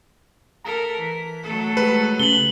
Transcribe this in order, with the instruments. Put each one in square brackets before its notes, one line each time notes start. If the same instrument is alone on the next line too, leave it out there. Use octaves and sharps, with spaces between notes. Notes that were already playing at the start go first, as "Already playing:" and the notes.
[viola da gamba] A4 A#4 [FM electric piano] A#5 B6
[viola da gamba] E3
F#3 A3 A4
[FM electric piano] G#3 G4 [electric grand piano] B4
[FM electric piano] C#3 [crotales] F#7 G7